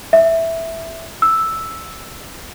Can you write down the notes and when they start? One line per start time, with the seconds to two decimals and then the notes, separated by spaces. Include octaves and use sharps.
0.13 E5
1.22 E6